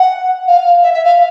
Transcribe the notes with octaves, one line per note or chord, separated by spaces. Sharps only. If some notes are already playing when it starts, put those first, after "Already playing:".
Already playing: F#5
F5
E5
E5
F5